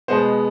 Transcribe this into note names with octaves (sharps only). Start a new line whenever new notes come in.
B2 G#3 B3 C5